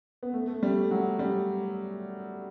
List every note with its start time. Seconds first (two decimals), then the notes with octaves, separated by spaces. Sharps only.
0.23 B3
0.34 A3
0.48 A3
0.63 G3
0.77 A3
0.91 F#3
1.19 G3